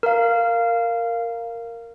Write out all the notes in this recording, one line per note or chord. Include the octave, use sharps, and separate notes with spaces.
A#4 F5